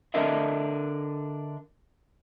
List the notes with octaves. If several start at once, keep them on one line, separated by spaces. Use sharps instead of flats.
D3 D4 A#4 D#5 E5